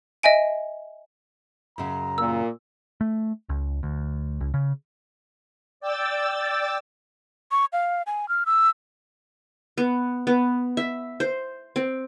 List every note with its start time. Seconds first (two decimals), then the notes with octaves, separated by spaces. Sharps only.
0.23 D#5 E5 G#5 D7
1.78 F#2 C#3 A#5
2.18 A#2 E6
3.01 A3
3.49 C#2
3.83 D2
4.41 C#2
4.54 C#3
5.80 D5 G5 E6 A6
7.51 C#6
7.73 F5
8.07 G#5
8.29 F6
8.46 E6
9.78 B3
10.27 B3
10.77 E5
11.20 C5
11.76 C4